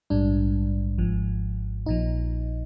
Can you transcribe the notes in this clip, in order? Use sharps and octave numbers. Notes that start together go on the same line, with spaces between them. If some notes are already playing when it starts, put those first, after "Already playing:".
A#1 G#2 G3 D4
G#1 G#2 F3
A#1 A#2 F3 D#4